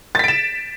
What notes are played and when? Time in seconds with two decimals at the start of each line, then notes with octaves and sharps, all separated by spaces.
0.15 A6
0.19 B6
0.24 D7
0.28 E7